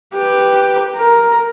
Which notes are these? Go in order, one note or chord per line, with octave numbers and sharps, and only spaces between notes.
G4 B4
A#4